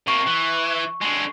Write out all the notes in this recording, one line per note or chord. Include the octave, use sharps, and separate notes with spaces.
C3 A#3 C#6
E3
D3 G#3